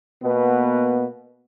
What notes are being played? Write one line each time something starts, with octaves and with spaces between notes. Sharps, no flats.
B2 A#3 B3